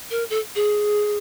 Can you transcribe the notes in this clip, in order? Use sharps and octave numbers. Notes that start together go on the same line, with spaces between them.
A#4
A4
G#4